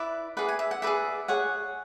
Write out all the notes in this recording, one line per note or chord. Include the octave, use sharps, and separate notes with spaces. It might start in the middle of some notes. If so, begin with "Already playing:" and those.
Already playing: E4 B4 D5 E5
G#4 B4 D5 F#5
G#5
E5
F#5
G#4 B4 D5 E5
G#4 C#5 F#5